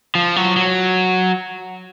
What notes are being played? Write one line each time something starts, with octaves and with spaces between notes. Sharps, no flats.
F3
F#3
F#3